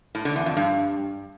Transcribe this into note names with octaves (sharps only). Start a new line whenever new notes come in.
A2
D3
E2
F2
G2